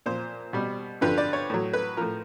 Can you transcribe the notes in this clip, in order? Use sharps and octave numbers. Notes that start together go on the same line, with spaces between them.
A#2 F3 C5
B2 G3
G2 D3 F3 B4
D5
C#5
A2 F#3
B4
A2 F3 A#4